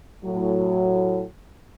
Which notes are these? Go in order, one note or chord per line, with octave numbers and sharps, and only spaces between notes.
A2 F#3